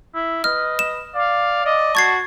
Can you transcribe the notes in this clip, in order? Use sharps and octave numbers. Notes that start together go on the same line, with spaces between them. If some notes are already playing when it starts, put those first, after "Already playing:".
E4
B4 D#5 F6
E7
D5 F5
D5 D#5
F#4 A5 C#6 G#6 C7